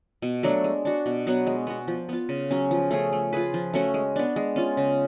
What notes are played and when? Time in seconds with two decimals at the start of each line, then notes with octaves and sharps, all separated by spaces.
0.22 B2
0.43 F#3 A3 D4
0.64 G#3
0.85 D4 F#4
1.06 B2
1.27 F#3 B3 F#4
1.47 G#3
1.67 B3 F#4
1.87 F3
2.09 B3 F4
2.29 C#3
2.51 F#3 C#4
2.71 F3
2.91 A3 C#4 G#4
3.13 A3
3.33 F4 G#4 B4
3.54 F3
3.74 A3 C#4 F#4
3.94 G#3
4.16 B3 D4
4.36 G#3
4.56 C#4 F4
4.77 C#3